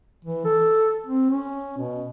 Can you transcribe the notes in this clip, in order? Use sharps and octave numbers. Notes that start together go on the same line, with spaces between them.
E3
A4
C4
C#4
B2